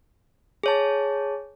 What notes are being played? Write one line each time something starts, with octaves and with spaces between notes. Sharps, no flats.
G#4 C#5 A5